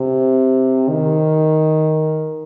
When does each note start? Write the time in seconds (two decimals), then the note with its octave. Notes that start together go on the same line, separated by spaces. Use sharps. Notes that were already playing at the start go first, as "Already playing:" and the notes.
Already playing: C3
0.89 D#3